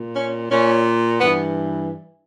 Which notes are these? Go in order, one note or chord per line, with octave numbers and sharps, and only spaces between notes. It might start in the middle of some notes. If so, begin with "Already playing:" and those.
Already playing: A#2
C#4
A#2 C#4
G2 E3 B3